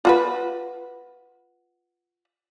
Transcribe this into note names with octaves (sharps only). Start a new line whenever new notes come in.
F4 F#4 B4